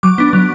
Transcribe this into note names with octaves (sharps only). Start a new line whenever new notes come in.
F#3 D6
B3 D4
F#3